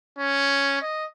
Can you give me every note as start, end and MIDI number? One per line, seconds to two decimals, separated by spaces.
0.18 0.81 61
0.82 1.05 75